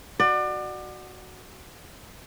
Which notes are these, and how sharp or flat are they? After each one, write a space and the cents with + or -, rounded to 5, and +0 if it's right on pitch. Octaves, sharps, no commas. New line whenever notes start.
F#4 +0 D5 +30